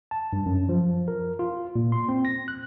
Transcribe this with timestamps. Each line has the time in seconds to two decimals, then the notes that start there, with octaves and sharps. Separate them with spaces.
0.11 A5
0.33 G2
0.46 F#2
0.69 F3
1.08 A#4
1.39 F4
1.76 A#2
1.92 C6
2.09 C4
2.25 A#6
2.48 F#6